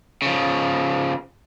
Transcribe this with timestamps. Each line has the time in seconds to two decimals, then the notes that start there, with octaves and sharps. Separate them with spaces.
0.22 C#3 F3